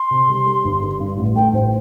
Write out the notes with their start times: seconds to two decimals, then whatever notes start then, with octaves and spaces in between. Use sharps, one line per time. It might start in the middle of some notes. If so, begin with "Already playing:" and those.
Already playing: C6
0.11 C3
0.29 G3
0.47 G3
0.65 G1
0.82 G3
1.00 G2
1.17 A1
1.35 A3 G5
1.53 A1 C5